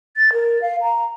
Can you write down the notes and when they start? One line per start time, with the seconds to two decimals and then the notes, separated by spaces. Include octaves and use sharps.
0.17 A6
0.33 A#4
0.62 F5
0.82 A#5